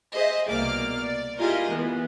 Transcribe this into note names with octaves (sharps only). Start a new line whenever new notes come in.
G#4 C5 D#5 E5
C2 B2 A#3 D5 D6 F6
D5
E4 F4 G4 G#4 A#4 D#5
E3 B3